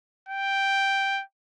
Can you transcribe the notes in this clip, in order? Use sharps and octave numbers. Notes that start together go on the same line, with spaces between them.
G5